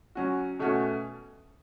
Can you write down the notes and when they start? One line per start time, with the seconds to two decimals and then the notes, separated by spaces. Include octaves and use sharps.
0.15 F#3 C#4 F#4
0.59 B2 A3 C#4 F#4